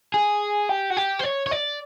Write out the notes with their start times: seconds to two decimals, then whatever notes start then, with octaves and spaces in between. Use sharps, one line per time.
0.14 G#4
0.69 G4
0.90 F#4
0.97 G4
1.19 C5
1.24 C#5
1.46 C#5
1.51 D5